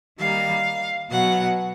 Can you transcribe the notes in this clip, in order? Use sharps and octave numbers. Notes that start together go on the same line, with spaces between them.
D#3 G3 A#3 F5
B2 F#3 B3 F#5